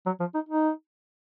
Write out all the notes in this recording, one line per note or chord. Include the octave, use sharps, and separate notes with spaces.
F#3
F3
D#4
D#4